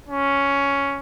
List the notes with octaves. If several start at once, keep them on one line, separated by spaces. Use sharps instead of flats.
C#4